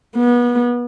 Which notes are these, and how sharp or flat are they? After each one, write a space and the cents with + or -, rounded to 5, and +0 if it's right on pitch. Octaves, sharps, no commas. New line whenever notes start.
B3 -30